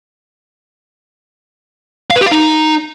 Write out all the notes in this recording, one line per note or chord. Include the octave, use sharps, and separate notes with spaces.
F5
B4
G4
F5
D#4